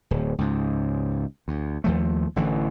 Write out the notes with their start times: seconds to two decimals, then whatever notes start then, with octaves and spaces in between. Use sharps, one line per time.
0.11 D1
0.38 C#2 G#2
1.48 D2
1.84 D#2 F3 A3
2.36 A1 D3 E3